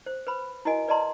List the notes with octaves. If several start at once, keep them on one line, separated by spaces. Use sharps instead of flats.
C5
B4 C5 B5
E4 F#4 A#4 D#5 G#5
B4 D5 D#5 A5 A#5 C6